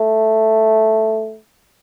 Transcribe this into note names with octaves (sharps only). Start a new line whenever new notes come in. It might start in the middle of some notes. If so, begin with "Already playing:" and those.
Already playing: A3